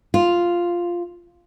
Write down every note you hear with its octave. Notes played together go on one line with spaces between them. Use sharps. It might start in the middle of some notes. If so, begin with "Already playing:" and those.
F4